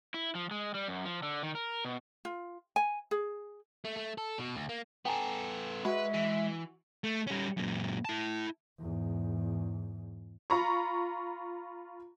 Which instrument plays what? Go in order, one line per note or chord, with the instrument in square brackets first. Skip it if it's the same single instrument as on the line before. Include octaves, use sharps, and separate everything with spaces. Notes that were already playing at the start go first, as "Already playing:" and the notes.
[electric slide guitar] E4
F3
G#3
G3
F#2
F3
D3
D#3
A#4
B2
[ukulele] F4
G#5
G#4
[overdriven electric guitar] A3
A3
A4
B2
D2
A#3
[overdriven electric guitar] B3 A4 [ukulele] G5 G#5 A#5
[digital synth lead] G#3 [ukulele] F#4 [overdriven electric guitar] B4 [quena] E5
[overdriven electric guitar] E3
[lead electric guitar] A3
G3 C#4
F#2 A#2
E4 A5
[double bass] E2 G#2
[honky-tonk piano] F4 A#5 B5 C#6